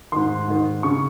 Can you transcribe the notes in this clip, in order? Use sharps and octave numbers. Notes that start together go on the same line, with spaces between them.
G#2 D#3 C6
G#2 D#3
C#3 C#6